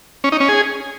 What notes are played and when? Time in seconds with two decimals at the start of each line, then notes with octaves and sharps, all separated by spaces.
0.24 C#4
0.32 D#4
0.40 C#4
0.49 G#4